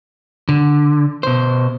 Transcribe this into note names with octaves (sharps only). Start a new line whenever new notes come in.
D3
B2 C5